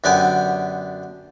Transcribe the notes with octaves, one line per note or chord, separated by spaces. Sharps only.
F#2 D3 B3 G4 G#5